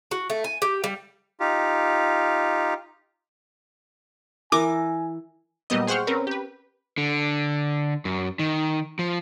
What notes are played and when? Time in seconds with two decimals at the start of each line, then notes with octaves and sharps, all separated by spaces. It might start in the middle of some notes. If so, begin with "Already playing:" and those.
0.11 F#4
0.30 A3
0.44 G#5
0.62 G4
0.84 G3
1.40 D#4 F4 G4
4.52 E3 A#4 G#5 D6
5.70 A#2 F#3 G3 B3 D#5
5.87 G#4 C5 F#5 G5 C#6 F6
6.07 C4 C#4 A#4 B4
6.27 G4 B4
6.98 D3
8.05 F#2
8.39 D#3
8.99 F3